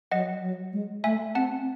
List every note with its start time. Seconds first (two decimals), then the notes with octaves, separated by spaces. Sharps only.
0.12 F#3 D#5 F#5
0.42 F#3
0.73 G#3
1.04 A3 E5 G#5
1.35 C4 F#5 A5